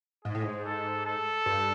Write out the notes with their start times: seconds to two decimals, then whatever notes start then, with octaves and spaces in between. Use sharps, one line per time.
0.24 G#2 G#4
0.35 A2
0.43 G#2
0.65 A4
1.05 A4
1.46 G2